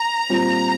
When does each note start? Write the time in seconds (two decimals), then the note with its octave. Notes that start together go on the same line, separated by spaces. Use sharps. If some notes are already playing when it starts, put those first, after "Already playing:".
Already playing: A#5
0.29 A#2 G3 C4 F4